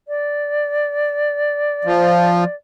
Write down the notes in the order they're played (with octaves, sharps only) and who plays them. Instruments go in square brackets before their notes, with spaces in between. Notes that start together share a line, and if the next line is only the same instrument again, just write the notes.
[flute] D5
[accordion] F3